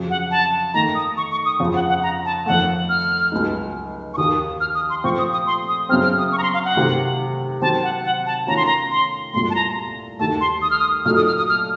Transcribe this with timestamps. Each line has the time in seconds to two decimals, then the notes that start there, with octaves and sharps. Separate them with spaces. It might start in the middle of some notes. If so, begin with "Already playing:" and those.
Already playing: F2 C#3 F#3
0.10 F#5
0.31 A5
0.74 D#3 A3 D#4 A#5
0.95 D#6
1.17 C#6
1.31 C#6
1.45 D#6
1.60 F2 C#3 F3
1.75 F#5
1.89 F#5
2.03 A#5
2.25 A5
2.46 F2 D#3 A3 F#5
2.89 F6
3.32 C#2 C#3 F#3 A3 D#4
4.14 C#6
4.18 D#2 D#3 A#3 D#6
4.61 F6
4.75 D#6
4.90 C6
5.04 A#2 F3 A3 C4 C#6
5.18 D#6
5.33 D#6
5.47 C6
5.69 D#6
5.89 F#2 C#3 F#3 C4 F6
6.04 F6
6.18 D#6
6.32 C#6
6.38 A#5
6.43 C6
6.54 F5
6.65 F#5
6.75 C3 D#3 A3
7.62 D#3 F#3 C4 A5
7.83 F#5
8.04 F#5
8.26 A5
8.47 D#3 A3 C#4 F4 A#5
8.57 C6
8.66 A#5
8.91 C6
9.33 C2 A#2 A3 C6
9.50 A5
9.55 A#5
10.19 D#2 D#3 A3 A5
10.41 C6
10.62 D#6
10.71 F6
10.79 D#6
11.05 A#2 F#3 A3 D#4 A4 F6
11.16 D#6
11.27 F6
11.38 D#6
11.49 F6